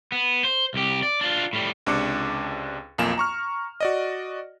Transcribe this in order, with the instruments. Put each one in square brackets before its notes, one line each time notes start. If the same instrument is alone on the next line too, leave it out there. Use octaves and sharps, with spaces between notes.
[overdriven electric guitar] B3
C5
C2 G4
D5
D4 F4
A2 G3
[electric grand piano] C#2 C3 D4 D6 C#7
B1 F2 A#3 F4 G#5 E7
A#5 C#6 F6
F#4 D5 D#5